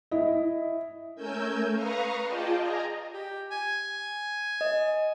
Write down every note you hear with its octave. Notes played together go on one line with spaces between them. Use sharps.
E4 D#5
A3 C#4 A#4 G#5 E6 G6
B4 F5 A#5 C#6 D#6 F6
F4 G#4 D5 D#5 G5 A5
D#5 G#5 A#5
G4
G#5
D#5